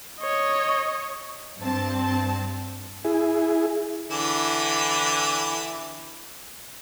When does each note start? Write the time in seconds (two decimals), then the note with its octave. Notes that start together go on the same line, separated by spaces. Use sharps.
0.20 C#5 D#5
1.60 G2 C4 A5
3.05 E4 G#4
4.11 D3 E3 E4